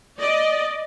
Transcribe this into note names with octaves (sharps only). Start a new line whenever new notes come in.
D5 D#5